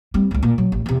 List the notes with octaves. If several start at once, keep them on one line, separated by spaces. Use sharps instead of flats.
G3 C4
E1 C#2
A#2
F#3
A1
E2 C3